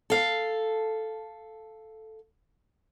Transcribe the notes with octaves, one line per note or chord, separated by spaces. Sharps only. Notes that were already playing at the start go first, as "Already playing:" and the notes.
A4 F5